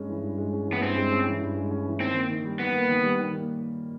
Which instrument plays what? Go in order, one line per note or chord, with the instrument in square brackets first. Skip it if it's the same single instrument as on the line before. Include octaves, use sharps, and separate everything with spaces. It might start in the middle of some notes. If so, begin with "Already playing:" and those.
Already playing: [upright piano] G2 G#3 C#4
E3
G2
G#3
C#4
[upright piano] E3 [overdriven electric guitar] B3
[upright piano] G2 [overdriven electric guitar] C4
[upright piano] G#3
C#4
E3
G2
G#3
C#4
E3
[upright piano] D#3 [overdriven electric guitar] C4
[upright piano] A#3
D#3
G3
[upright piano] D#3 [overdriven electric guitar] B3
[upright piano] A#3
D#3
G3
D#3
A#3